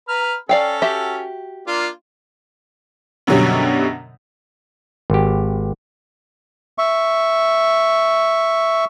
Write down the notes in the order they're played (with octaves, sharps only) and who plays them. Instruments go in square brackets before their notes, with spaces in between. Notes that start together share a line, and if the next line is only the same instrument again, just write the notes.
[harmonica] B4 A#5 F6
[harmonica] C#4 A4 [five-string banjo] D5 F5 G5
[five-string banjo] F#4 G4 E5
[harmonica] A#3 D4 F4
[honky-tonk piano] F#2 B2 D3 F#3 G3
[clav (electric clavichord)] G#1 G4
[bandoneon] E5 C#6